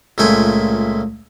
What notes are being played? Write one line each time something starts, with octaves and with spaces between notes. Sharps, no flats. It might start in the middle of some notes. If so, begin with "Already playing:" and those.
C#2 A#2 A3 G5 G#5